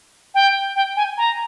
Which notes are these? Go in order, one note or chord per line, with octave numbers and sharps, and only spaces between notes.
G5
G5
G#5
A#5